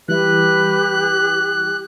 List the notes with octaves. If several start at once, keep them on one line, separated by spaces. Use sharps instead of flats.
E3 G3 E4 G4 B4 F#6